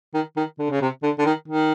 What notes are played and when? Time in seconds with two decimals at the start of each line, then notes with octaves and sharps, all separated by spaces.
0.14 D#3
0.36 D#3
0.59 D3
0.70 C#3
0.81 C3
1.03 D3
1.19 D3
1.26 D#3
1.48 D#3